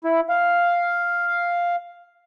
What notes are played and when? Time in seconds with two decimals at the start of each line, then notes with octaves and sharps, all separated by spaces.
0.04 E4
0.29 F5